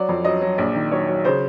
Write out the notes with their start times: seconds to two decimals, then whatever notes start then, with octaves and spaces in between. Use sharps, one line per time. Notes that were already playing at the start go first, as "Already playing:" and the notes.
Already playing: F#3 D5
0.09 F2
0.25 F#3 D#5
0.41 F#3
0.58 A#1 D5
0.75 D#3
0.92 F#3 C#5
1.08 F#3
1.25 C#3 C5